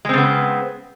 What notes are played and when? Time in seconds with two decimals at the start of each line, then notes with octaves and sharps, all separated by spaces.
0.05 G#3
0.09 C4
0.13 C#3
0.18 B3